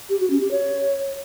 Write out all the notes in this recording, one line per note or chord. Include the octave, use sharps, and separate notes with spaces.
G4
F#4
C#4
G4
C#5